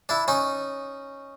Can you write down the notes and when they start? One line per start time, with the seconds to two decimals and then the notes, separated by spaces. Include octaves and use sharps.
0.09 D4 E4
0.28 C#4 D#4